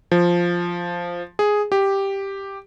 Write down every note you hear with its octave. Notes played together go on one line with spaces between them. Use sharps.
F3
G#4
G4